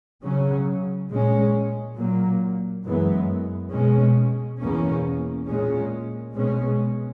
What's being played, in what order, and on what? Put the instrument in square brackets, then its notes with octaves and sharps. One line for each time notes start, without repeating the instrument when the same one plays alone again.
[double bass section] C#3 F#3 C#4
A#2 G#3 C#4
A#2 F#3 A#3
F#2 E3 G#3 B3
B2 G#3 C#4
E2 B2 A#3 C#4
A#2 G#3 C#4
B2 G#3 C#4